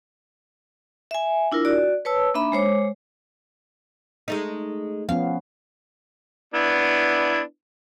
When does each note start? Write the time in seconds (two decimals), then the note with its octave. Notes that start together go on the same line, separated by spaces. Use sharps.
1.11 E5 G#5
1.52 D4 E4 F4 A#4
1.65 F#4 D5
2.05 B4 C#5 A5 E6
2.34 A#3 D4 D#4 E5 B5
2.52 G#3 C5 C#5 D6
4.28 G#3 A3 D#4
5.09 F3 B3 C#4 F5
6.54 B3 D4 E4